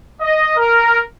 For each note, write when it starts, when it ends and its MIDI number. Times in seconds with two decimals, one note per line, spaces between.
0.21 0.53 75
0.57 0.98 70